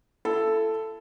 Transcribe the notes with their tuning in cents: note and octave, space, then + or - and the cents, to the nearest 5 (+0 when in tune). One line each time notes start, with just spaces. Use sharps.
E4 +35 A4 +0